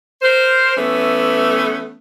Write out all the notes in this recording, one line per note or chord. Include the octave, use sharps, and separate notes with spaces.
A#4 C5
E3 A3 B3 C#4